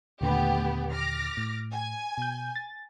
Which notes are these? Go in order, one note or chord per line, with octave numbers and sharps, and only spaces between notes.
D#2 A#2 D3 A3 B3 G4
D6 F6 A#6
A2
G#5
B2 G6
A6